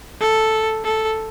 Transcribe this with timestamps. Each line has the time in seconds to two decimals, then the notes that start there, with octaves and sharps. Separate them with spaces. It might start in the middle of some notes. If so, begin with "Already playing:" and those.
0.20 A4
0.84 A4